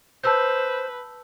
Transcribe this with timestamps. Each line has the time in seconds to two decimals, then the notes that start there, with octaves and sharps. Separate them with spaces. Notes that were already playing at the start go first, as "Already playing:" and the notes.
0.24 B4 C5 A5 E6 G6